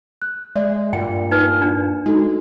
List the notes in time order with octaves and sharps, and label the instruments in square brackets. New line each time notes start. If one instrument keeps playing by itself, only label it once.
[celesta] F#6
[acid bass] G#3 [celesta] D5 E5
[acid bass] G2 [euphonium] A#2 [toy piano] G5
[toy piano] D#4 B4
D4
[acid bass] G#3 [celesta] D#4 F#4 A4